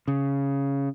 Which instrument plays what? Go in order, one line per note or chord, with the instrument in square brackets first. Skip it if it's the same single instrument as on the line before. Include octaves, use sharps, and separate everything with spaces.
[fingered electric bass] C#3